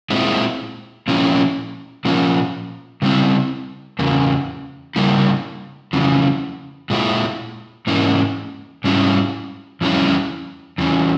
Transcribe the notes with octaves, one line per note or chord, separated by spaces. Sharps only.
A#2 G#3 C4 E4
A#2 F3 A#3 C#4 E4
A#2 F3 A#3 C#4
C#3 G3 C4 E4
E2 C#3 A#3
C#3 G3 A#3 E4
F2 C#3 E3
A#2 G#3 E4
G#2 E3 A#3 C#4 E4
G#2 G3 C#4 E4
F2 E3 G3 C#4 E4
E2 E3 C#4